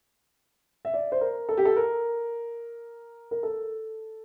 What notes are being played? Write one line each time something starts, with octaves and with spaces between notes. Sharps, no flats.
E5
D5
C5
A#4
A4
G4
A4
A#4
A#4
A4